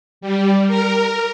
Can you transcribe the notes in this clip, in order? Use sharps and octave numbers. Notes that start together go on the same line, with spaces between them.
G3
A#4